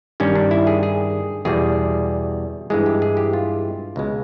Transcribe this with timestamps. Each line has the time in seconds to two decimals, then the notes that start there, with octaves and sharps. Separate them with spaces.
0.20 G2 D#3 G3 C#4
0.36 D4
0.51 E4
0.67 G#4
0.83 G#4
1.45 E2 B2 G3 G#4
2.70 G2 E3 G#3 G#4
2.86 G4
3.02 G#4
3.17 G4
3.33 F4
3.96 C#2 B2 G#3